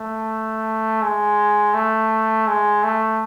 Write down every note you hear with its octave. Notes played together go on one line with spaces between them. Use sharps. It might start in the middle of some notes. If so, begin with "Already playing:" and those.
Already playing: A3
G#3
A3
G#3
A3